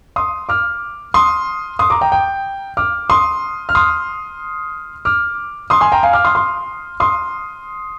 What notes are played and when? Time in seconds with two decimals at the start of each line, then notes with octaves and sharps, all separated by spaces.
0.16 C6 D#6
0.49 D6 F6
1.14 C6 D#6
1.79 C6 D#6
1.90 A#5 D6
2.01 G5 A#5
2.12 G5
2.77 D6 F6
3.10 C6 D#6
3.69 F6
3.75 C6 D#6
5.05 D6 F6
5.70 C6 D#6
5.81 G#5 C6
5.92 G5 A#5
6.03 F5 G#5
6.13 D6 F6
6.25 C6 D#6
6.35 C6 D#6
7.00 C6 D#6